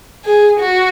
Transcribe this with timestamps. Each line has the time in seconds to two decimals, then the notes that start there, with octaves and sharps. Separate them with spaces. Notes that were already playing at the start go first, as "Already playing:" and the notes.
0.25 G#4
0.59 F#4